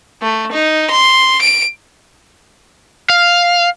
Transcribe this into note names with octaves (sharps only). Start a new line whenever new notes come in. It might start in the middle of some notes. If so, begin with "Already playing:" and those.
A3
D#4
C6
D7
F5